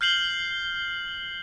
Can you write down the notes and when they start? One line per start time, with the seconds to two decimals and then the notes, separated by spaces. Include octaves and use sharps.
0.01 F6 G6 C7 F#7 G7